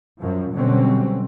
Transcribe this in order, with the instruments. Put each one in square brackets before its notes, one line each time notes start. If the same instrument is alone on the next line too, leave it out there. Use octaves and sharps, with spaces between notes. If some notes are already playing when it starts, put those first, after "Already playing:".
[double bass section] F#2 F3
B2 D3 F#3 G3 C4 C#4